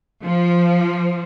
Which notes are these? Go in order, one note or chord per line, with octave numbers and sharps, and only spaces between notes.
F3